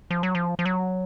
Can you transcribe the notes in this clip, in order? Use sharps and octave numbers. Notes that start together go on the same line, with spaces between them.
F3
F#3
F3
F3
F#3